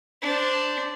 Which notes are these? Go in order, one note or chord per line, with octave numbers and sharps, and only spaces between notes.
D4 C5